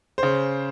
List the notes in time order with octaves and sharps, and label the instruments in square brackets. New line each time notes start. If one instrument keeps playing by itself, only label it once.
[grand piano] C#3 C5